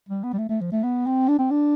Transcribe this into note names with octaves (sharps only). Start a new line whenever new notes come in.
G3
B3
G3
A3
A3
F3
A3
B3
C4
D4
C4
D4